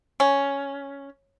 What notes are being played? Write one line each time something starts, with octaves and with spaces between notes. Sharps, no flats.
C#4